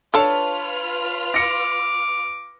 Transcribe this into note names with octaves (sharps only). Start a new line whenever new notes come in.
D4 F4 A4 B4 C#5 A5 F6
D6 A#6 C#7